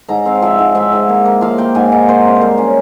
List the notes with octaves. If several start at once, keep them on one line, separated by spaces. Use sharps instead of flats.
G#2 A#5
C4 F5
F3 E5
G#2
G#2 E5
G#2
A#3
A#3
F3 F5
A#3 G5
G#2 G#5
G#2 A#5
A#3 C5
C3
C5
G3 A#4
C#4